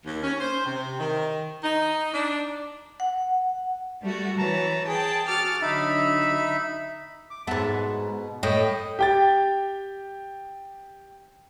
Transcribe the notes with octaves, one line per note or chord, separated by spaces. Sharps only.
D#2
C#4
C5
C3
D#3
D#4
D4
F#5
G3 A3 F#4
E3 B4 C#5 A5 A#5
G#4 G5 A5
F#4 D6 F6 A6
D3 F#3 D#4 E5 B5
D6
G#2 B3 E5 A5
B2
A2 D#5 G5
G4 G5 A6